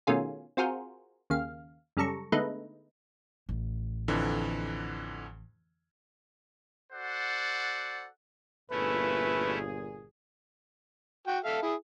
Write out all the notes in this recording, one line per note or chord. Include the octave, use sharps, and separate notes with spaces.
B2 D#3 A3 C#4 F4 G#4
C4 F4 F#4 G#4 A#4 C5
D#2 C#3 F5
F#2 C#3 G3 A4 A#5 C#6
D3 G#3 A3 B3 D#4 B4
A1
F2 D3 E3
F#4 A4 C5 D5 F#5
G1 A#2 A3 C#4 E4 G#4 B4
F#4 G5
A4 E5 F5
E4 G#4